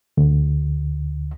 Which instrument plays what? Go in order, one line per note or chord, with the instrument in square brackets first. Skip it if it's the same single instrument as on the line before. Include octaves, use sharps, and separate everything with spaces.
[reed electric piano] D2